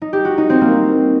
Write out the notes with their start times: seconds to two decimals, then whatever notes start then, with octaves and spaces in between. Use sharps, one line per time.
0.02 D#4
0.13 G4
0.25 F#4
0.38 D#4
0.50 C4
0.61 A#3